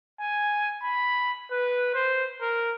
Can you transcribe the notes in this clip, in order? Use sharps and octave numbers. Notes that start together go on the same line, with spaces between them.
G#5
B5
B4
C5
A#4